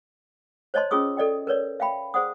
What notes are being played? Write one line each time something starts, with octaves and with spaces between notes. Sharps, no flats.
C5 C#5 D#5 A5 C6
C#4 F4 G#4 C#6 D#6 E6
A4 D5 D#5 G5
A#4 B4 C#5 D5
E5 F5 G5 B5
G#4 C5 D5 F#5 D#6